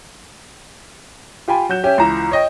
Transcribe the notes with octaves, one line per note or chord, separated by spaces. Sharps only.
F4 G4 G5 G#5 B5
F#3 F#4 G6 E7
C#4 G4 E5
C#2 E3 A#5 E7
C#5 D#5 G5